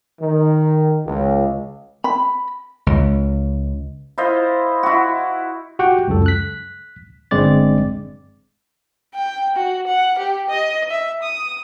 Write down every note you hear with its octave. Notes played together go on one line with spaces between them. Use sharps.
D#3
C#2
B5
C#2
E4 F4 C5 D#5
E4 F#4
F#4 G4 F#5 G5
C#2 F#2 A4
F#6 B6
G1 G2 G#3 C4 D5 A6
G5
F#4
F#5
G4
D#5
E5
D#6